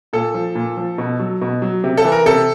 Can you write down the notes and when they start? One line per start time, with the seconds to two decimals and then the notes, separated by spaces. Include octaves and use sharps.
0.13 A#2 A4
0.34 F3
0.55 A#2
0.77 F3
0.98 B2
1.19 F#3
1.41 B2
1.62 F#3
1.84 C3
1.97 A4
2.05 E3
2.12 A#4
2.26 C3 A4